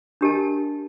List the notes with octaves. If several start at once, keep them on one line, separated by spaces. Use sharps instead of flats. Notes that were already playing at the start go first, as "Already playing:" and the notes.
D4 G4 A#4 D#5 A5